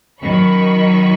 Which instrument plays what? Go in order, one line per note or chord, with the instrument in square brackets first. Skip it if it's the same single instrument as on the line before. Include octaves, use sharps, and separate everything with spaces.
[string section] F#2 D#3 F#3 B5 C#6